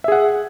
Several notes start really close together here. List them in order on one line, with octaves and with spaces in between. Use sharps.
E5 G#4 F#5